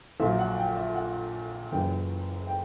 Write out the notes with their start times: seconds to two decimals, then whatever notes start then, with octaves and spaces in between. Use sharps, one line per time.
0.20 A#1 A#2 F#3 E5
0.39 F#5
0.57 G5
0.77 E5
0.95 F#5
1.71 F#1 F#2 E3 G5
2.47 G5